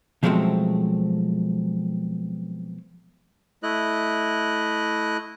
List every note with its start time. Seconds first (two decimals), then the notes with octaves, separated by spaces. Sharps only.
0.23 B2 F3 F#3 G#3 A3 C4
3.63 A3 E4 D#5 F#6